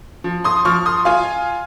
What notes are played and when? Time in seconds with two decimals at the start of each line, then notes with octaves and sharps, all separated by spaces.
0.24 F3
0.44 C6 D#6
0.65 F3 C#6 F6
0.86 C6 D#6
1.05 F4 F5 G#5